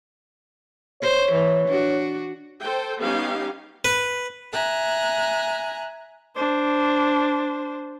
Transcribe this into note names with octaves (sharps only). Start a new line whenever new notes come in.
C5 C#5
E3
D4 F#4
A4 C5 G5
G3 B3 C#4 D#4 G4 F5
B4
E5 G#5 A#5 F#6
D4 C5